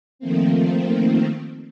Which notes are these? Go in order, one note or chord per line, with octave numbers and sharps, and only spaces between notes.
D#3 F3 A3 A#3 C4